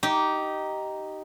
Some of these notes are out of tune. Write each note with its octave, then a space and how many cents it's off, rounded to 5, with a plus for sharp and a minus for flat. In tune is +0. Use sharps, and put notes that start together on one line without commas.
D#4 +0 G4 -15